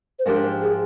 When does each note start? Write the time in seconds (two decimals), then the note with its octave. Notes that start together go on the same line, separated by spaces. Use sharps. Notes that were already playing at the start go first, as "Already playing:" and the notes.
0.19 C5
0.26 G#2 F3 G#3 D4 G4 A#4
0.62 G#4